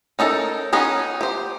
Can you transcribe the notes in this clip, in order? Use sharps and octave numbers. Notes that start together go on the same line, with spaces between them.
C#4 D#4 A4 A#4
F3 B3 C#4 D#4
G4 C5